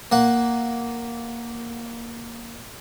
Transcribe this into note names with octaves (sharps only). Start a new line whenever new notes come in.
A#3 F#5